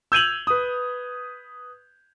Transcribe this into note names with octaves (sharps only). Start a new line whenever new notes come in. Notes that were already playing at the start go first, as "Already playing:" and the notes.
E6 G6 G#6 D#7 F7 F#7
B4 D#6